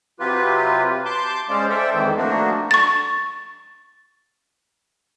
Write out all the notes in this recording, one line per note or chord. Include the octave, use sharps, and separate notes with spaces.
C3 F#3 F4 G4 B4
A5 C6 D6 G6
G#3 C#4 C5 D5 F5
A4 C5 D5 E5 G5
F2 D#3 E3 G#3
F3 A3 A#3 D4 F#4
C#6 A6